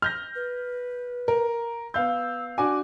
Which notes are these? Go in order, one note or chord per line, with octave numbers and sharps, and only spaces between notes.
F6 G6 A#6
B4
A#4
B3 F5 E6 G6
D4 F#4 G#5 D6